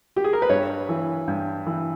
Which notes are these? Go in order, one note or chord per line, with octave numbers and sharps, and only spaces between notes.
G4
G#4
A#4
B4
G2 C#5
E3
G2
E3